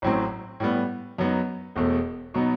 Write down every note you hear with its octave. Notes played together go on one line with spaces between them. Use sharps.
A1 A2 F#3 C4
A2 G3 B3
F#2 F#3 B3 D#4
E1 E2 B2 A3
B2 F#3 B3 D#4